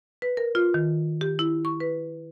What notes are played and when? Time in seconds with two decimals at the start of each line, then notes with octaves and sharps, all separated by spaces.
0.22 B4
0.37 A#4
0.55 F4
0.74 D#3
1.21 G4
1.39 E4
1.65 C#6
1.80 B4